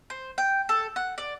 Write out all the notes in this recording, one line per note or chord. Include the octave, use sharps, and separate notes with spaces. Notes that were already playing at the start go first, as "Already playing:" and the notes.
C5
G5
A4
F#5
D5